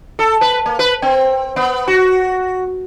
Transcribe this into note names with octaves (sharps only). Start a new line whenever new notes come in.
A4
B4
A#3
B4
C4
B3
F#4